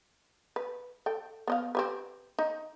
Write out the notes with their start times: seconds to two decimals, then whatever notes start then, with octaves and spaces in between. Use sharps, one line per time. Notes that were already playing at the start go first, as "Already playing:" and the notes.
0.56 B4
1.06 A4 G5
1.47 B3 D#5 F5
1.75 C4 G4 B4
2.38 D#4